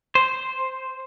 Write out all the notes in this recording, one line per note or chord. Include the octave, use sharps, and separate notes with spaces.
C5